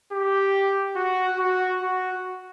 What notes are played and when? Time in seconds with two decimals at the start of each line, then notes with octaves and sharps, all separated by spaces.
0.12 G4
0.96 F#4
1.39 F#4
1.81 F#4